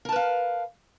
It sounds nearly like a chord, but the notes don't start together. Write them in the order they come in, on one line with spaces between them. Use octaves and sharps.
A#4 A5 B4 F5